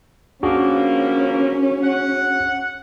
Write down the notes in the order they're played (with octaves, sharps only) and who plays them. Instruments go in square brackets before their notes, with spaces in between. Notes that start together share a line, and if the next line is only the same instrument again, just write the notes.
[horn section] B2 F3 A#3 [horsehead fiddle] C#4 [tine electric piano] D4 F#4 G#4
[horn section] F#5